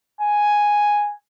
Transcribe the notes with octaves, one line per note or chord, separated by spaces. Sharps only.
G#5